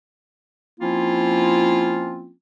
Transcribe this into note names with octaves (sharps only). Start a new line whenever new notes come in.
F3 A#3 C4 C#4 E4 F4